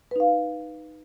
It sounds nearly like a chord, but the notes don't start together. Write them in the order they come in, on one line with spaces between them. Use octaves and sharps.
B4 D#4 F5